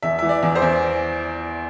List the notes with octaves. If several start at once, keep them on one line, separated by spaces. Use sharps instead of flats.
E2 E5
E3 E5
D5
E2
C5
E2